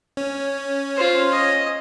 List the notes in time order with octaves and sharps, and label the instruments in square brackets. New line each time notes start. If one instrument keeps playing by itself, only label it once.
[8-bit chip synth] C#4 C#5
[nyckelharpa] F4 C5
D#5